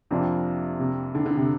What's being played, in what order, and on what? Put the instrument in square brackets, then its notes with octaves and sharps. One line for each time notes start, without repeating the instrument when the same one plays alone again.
[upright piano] F2 C3 A#3 D4 [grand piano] F3
[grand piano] C3
D3
D3
C3